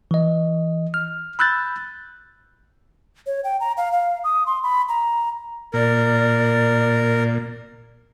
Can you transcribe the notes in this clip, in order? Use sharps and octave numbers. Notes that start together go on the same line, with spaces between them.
E3 D#5
F6
B5 E6 F#6 G6 A6
C#5
G5
A#5
F5
F5
D#6
C6
B5
A#5
A#2 A#4 D5